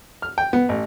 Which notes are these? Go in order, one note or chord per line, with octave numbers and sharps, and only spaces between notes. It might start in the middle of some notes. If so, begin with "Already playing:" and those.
F6
G5
B3
A1